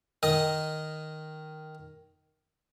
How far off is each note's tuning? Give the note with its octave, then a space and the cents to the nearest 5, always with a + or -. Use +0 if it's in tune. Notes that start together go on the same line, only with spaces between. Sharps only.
D#3 +0 D#5 +0 D#6 +0